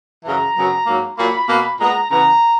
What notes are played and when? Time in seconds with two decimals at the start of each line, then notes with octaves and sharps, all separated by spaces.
0.25 F#2 C#3 E3 A#5
0.56 F#2 C#3 F#3 B3
0.86 G#2 F#3 A#3
1.18 A#2 F#3 A#3 B5
1.48 B2 A#3
1.79 A#2 G#3 B3 A#5
2.11 C#3 E3 B3 A#5